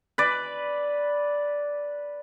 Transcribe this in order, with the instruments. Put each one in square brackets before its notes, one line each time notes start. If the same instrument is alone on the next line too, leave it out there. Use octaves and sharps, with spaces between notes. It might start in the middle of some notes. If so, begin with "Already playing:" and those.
[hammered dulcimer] B4 D5